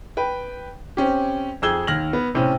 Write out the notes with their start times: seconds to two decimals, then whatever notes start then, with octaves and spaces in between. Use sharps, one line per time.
0.17 B4 G5
0.97 C4 C#4 G4
1.62 F2 G#4 E6 G#6 G7
1.87 D#2 F6 A#6 F#7
2.13 B3
2.34 A2 C3 C4 C#4